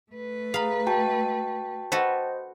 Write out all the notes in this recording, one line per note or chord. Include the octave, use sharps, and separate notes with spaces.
A3 B4
G#4 F5 A#5 B5
F#4 G5 A5
F#4 A4 B4 C5 D#5